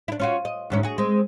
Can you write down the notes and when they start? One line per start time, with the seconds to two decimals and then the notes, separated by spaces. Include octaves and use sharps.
0.08 D4 E4
0.20 C#4 F4 F#4
0.45 D#5
0.70 D2 G#2 C#4
0.83 F#4 G#4
0.98 G#3 C4